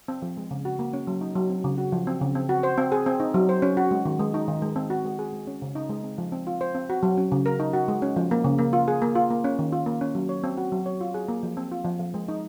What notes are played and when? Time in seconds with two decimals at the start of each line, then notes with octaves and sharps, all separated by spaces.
0.08 C4
0.22 F3
0.37 G#3
0.51 C#3
0.65 F#4
0.79 A#3
0.93 C#4
1.07 F#3
1.21 D#4
1.36 F#3
1.50 C4
1.64 C#3
1.78 F#4
1.92 F3
2.07 C4
2.21 C#3
2.35 C4
2.49 F#4
2.63 C5
2.78 C4
2.92 G#4
3.06 C4
3.20 D#4
3.34 F#3
3.49 C5
3.62 C#4
3.77 F#4
3.91 G#3
4.06 D#3
4.19 G#3
4.34 D#4
4.48 D#3
4.62 G#3
4.76 C4
4.90 F#4
5.05 G#3
5.19 G#4
5.33 G#3
5.47 C#4
5.62 C#3
5.75 D#4
5.89 G#3
6.03 C4
6.18 F3
6.32 C4
6.47 F4
6.61 C5
6.75 C4
6.90 F#4
7.03 F#3
7.18 C#4
7.32 C#3
7.46 A#4
7.60 D#4
7.73 F#4
7.88 G#3
8.02 C#4
8.16 F3
8.31 A#3
8.44 C#3
8.59 A#3
8.73 F4
8.88 G#4
9.02 A#3
9.15 F4
9.30 A#3
9.44 C#4
9.59 D#3
9.73 F4
9.86 A#3
10.01 C#4
10.15 F#3
10.29 C#5
10.44 C4
10.57 F#4
10.72 F#3
10.86 C#5
11.01 F4
11.14 G#4
11.28 A#3
11.43 F3
11.57 C4
11.72 F4
11.85 F3
12.00 F3
12.14 G#3
12.28 D#4